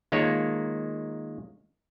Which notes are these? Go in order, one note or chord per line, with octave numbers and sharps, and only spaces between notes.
D#3 G#3 A#3 F4 C#5